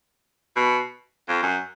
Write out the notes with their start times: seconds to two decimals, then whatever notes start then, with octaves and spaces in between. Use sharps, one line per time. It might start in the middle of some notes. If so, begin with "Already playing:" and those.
0.56 B2
1.28 F2
1.42 F#2